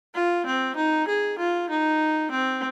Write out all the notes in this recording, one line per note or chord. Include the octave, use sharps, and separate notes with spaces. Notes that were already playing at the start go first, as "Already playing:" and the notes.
F4
C4
D#4
G#4
F4
D#4
C4